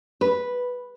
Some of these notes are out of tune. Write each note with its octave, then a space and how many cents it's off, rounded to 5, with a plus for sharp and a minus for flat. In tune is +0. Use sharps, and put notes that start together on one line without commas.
B4 -5